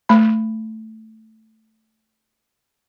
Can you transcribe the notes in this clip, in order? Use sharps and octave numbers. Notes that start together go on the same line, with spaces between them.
A3 B5